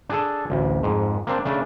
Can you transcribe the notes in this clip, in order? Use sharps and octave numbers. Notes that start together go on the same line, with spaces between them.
D4 G#4 A4
A1 D2
F2 G#2
A#3 C4 D4
C#3 A3 D4